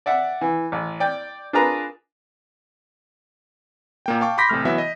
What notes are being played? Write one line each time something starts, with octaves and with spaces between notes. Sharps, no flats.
D5 E5 F#5
E3
A1
D5 G5
D4 F4 G#4 A#4 B4 A#5
A#2 A#3 G5
F5 G5 A5 C#6 D6
B5 C6 D6 G6 A#6 B6
A1 C3 A3 F6
E3 F#3 B3 E5
D#5